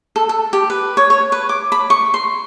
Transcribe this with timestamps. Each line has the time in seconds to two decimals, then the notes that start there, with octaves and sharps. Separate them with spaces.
0.16 A4
0.29 A4
0.53 G4
0.70 B4
0.97 C#5
1.10 C#5
1.32 B4
1.49 D6
1.72 B5
1.90 C#6
2.14 C6